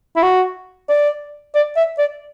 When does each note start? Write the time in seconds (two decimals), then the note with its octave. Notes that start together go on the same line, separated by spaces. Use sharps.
0.16 E4
0.22 F#4
0.89 D5
1.55 D5
1.76 E5
1.98 D5